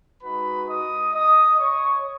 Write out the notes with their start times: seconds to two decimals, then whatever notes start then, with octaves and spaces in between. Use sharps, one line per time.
0.23 G#3 D#4 F#4 B4 B5
0.69 D#5 D#6
1.15 D#5 D#6
1.59 C#5 C#6